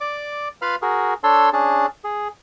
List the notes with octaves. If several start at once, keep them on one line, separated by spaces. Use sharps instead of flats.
D5 D6
F4 B4 F5 B5 F6
F#4 G#4 A#4
D4 A4 C#5 A5 C6 E6
C#4 D4 G#4 A5
G#4